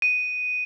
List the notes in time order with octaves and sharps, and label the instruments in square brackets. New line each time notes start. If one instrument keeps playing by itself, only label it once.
[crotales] D#7